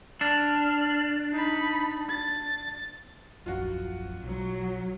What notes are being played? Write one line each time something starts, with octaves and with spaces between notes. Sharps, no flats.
D4 F6
D#4 B5
A6
D#1 A#1 F#2 F4 F#4
B1 F#3